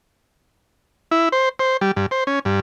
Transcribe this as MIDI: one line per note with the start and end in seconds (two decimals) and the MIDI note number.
1.11 1.29 64
1.32 1.49 72
1.59 1.77 72
1.81 1.91 55
1.96 2.06 43
2.11 2.24 72
2.27 2.39 61
2.45 2.60 43